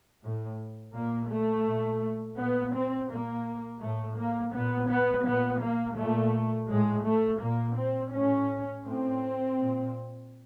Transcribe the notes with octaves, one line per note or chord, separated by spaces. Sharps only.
A2
A#2 A#3
A3
A#2
A#2 B3
C4
A#2 A#3
A2 A3
A#3
A#2 B3
B3
A#2 B3
A#3
A#2 A3
A2 G#3
A3
A#2 A#3
C4
A2 C#4
A2 C4
A#2